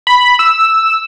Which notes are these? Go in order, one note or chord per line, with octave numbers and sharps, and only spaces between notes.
B5
E6